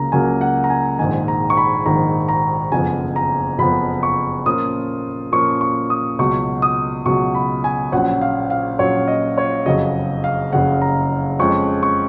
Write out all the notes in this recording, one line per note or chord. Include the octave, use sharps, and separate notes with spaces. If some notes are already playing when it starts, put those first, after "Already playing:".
Already playing: C#2 C#3 F#3 A#3 A#5
C#2 C#3 F#3 A#3 G#5
F#5
A#5
G#5
A#1 G#2 D#3 G#5
A#5
C#6
B5
A#1 G#2 D#3 A#5
A#5
F#1 F2 F3 B3 G#5
A#5
F#1 F2 F3 B3 B5
C#6
A#2 F3 A#3 C#4 F4 D#6
A#2 F3 A#3 C#4 F4 C#6
C#6
D#6
C#2 B2 F#3 C#6
D#6
C#2 B2 F#3 C#6
B5
G#5
A#1 A#2 F#3 C#4 F#5
F5
F5
A#1 A#2 F#3 C#4 C#5
D#5
C#5
F#1 F2 C#3 F#3 C#4 D#5
F5
F#1 F2 C#3 F#3 C#4 F#5
A#5
F2 F3 G#3 C#4 C#6
C#6